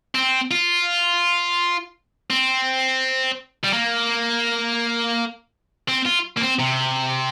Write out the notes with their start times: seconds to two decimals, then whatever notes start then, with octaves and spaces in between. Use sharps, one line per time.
0.15 C4
0.51 F4
2.30 C4
3.64 G3
3.73 A#3
5.88 C4
6.05 F4
6.37 A#3
6.41 C4
6.59 C3